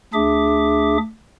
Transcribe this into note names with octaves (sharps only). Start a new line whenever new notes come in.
D2 D4 G#4 E5 D6